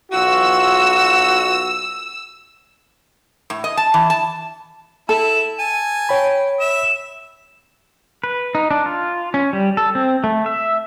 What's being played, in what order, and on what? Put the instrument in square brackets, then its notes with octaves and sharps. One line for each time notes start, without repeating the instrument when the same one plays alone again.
[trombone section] B1 F4 F#4 [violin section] E6
[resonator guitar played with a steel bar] A2
D#5
A5
E3
A5
[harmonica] E4 [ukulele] A4 [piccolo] E7
[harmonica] G#5 A5 [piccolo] D#7
[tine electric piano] C#5 B5 [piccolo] G5
[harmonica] E5 [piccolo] E7
[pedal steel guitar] B4
D#4
D4
F4
C#4
G3
A4
C4
A3
E5